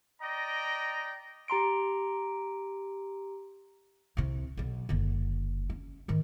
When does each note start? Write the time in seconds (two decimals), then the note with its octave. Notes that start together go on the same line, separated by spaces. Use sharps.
0.22 D5 D#5 G5 A#5
1.48 G4 A#5 C6 D7
4.17 C2 C3
4.57 B1 F#3
4.89 F#1 D3
5.70 C#4
6.08 G#2 D#3